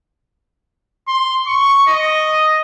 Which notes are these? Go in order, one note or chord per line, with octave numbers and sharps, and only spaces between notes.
C6
C#6
D#5